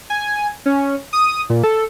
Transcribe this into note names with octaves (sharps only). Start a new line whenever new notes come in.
G#5
C#4
D#6
A#2
A4